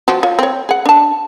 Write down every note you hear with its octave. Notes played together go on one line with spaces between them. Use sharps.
F3 F4 F#4
F4 C#5
C4 C#5
G#4 F#5
D4 A5